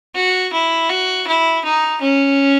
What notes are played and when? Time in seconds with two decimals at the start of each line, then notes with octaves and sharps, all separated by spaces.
0.15 F#4
0.53 E4
0.90 F#4
1.27 E4
1.64 D#4
2.01 C#4